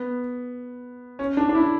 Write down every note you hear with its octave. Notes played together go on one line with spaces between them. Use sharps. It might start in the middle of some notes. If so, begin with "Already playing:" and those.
Already playing: B3
C#4
D4
D4
E4